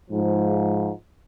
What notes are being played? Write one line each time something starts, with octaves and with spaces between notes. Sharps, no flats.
G#2 F3